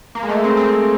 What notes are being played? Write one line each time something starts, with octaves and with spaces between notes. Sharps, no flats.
A#3
G#3
A3
C4
C4